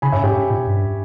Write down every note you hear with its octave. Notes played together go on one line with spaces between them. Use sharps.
C#3 G#5 B5
G2 C#5 E5
G#2 G4
G#2
A#2
G2